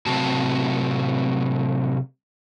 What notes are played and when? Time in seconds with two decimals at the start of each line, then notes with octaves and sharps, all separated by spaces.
0.06 A2 C3 F#3 C4 F#4 A5